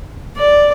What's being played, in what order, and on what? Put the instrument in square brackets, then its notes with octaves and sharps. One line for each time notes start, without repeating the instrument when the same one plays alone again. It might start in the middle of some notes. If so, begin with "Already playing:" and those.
[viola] D5